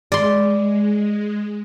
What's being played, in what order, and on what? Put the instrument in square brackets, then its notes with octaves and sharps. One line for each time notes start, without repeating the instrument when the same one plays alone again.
[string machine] G#3 [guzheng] D5 C6